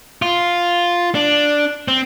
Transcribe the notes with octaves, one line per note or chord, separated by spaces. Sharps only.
F4
D4
C4